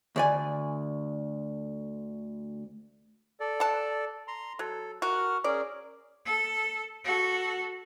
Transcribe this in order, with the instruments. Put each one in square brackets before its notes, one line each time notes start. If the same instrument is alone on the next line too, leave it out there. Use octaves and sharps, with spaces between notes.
[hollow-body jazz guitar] D2 D5 G#5
[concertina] A4 D5
[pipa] F#5 A5
[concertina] A#5 C6
[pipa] F#3 [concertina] A4
[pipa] F#4 [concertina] A#4 F#5 F6
[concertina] C#4 G#4 A#4 [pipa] D5
[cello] A4
F#4 A4